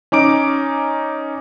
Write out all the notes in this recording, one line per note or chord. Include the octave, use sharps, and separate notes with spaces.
C#4 D#4 D6 D7